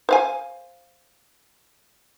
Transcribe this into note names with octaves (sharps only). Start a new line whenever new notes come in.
C5 F5 G#5